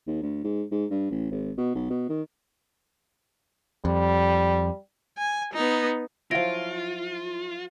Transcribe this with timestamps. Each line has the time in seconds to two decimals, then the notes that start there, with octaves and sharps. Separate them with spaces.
0.07 D#2
0.23 D2
0.44 G#2
0.71 G#2
0.91 G2
1.11 A1
1.31 G#1
1.57 B2
1.75 B1
1.90 B2
2.09 D#3
3.85 F2 G3
5.18 G#5
5.54 B3 D#4
6.31 F3 F#3 E4 F4 F5 A#6 D7